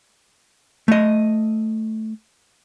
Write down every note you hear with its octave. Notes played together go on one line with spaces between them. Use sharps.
A3 D#5